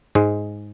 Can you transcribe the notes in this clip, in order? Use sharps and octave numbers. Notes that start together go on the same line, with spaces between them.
G#2 G#3